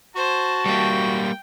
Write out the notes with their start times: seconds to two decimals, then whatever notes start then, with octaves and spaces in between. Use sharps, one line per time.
0.16 F#4 C5 A5
0.66 G3 A#3 G5